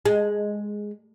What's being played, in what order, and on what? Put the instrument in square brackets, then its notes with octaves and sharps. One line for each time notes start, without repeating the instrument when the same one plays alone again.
[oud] G#3